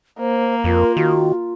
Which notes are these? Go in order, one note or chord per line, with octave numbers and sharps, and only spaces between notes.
A#3 C5
F2 F4 A#4
D#3 F#4